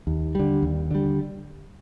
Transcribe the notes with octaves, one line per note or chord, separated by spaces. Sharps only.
D#2
D3 G3
D#2
D3 G3